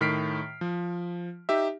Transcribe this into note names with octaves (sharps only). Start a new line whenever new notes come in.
A2 D#3 F6 B6 C7 D7
F3
D#4 G4 E5